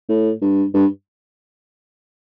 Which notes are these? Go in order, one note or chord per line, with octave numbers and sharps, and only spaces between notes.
A2
G2
G2